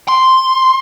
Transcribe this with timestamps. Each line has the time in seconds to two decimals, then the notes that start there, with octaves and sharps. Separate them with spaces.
0.08 C6